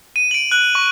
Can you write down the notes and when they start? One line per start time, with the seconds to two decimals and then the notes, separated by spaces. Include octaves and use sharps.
0.16 D#7
0.31 D7 F#7
0.51 F#6 F#7
0.75 C#6